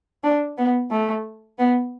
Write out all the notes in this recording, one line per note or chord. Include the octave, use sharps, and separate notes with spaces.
D4
B3
A3
B3